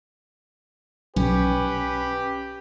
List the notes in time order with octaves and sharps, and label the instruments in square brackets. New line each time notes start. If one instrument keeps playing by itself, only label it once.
[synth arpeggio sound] B1 [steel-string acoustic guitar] C#4 [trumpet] G4 [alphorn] B4